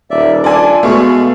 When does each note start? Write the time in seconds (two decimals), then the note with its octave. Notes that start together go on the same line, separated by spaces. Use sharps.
0.10 D#1 D5 E5
0.44 D4 F4 A4 D5 G#5
0.83 B2 G#3 A3 F5 C#6